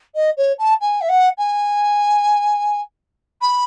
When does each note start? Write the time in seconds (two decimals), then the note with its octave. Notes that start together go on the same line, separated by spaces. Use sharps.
0.14 D#5
0.37 C#5
0.58 A5
0.80 G#5
1.01 E5
1.08 F#5
1.37 G#5
3.41 B5